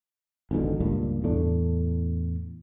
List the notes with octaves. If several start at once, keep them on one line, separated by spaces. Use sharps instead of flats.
G#1 F2 B2 D3
C#2 G2 A#2
E2 A2 A3 D4